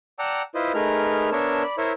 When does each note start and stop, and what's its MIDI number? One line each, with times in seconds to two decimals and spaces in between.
0.19 0.42 74
0.19 0.42 78
0.19 0.42 79
0.19 0.42 81
0.19 0.42 82
0.19 0.42 88
0.55 0.72 64
0.55 0.72 65
0.55 0.72 71
0.55 0.72 72
0.55 0.72 75
0.74 1.30 57
0.74 1.30 63
0.74 1.30 68
0.74 1.30 70
0.74 1.30 71
0.74 1.30 89
1.32 1.63 59
1.32 1.63 62
1.32 1.63 70
1.32 1.63 73
1.32 1.63 76
1.32 1.63 81
1.63 1.75 74
1.63 1.75 83
1.78 1.92 64
1.78 1.92 70
1.78 1.92 72
1.78 1.92 73
1.78 1.92 76